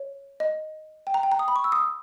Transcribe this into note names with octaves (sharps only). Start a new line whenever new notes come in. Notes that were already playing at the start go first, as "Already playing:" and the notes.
Already playing: C#5
D#5
G5
A#5
G5
A#5
D#6
B5
C#6
E6
D#6